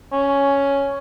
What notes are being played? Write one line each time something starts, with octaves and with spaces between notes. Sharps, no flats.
C#4